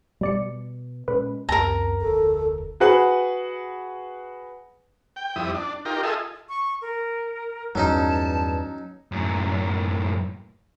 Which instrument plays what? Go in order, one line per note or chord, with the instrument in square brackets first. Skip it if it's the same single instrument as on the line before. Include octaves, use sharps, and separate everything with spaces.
[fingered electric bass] B2 [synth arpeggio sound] G3 D5 C#7
[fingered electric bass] A#2 G#3 C#4 [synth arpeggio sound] B4
[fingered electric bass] C#2 F#2 C4 [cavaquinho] A#4 A#5 [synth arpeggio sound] A5
[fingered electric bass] F1 D2 [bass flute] A4
[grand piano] F#4 G#4 B4 F#5
[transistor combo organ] G5
F2 G3 E4 D#6
D4
D#4 F4 G4 A#4
F4 G#4 A4 D#5 E5
[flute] C#6
A#4
[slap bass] E2 G2 [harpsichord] F#3 C#4 D#4 [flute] A5
[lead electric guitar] F#2 A2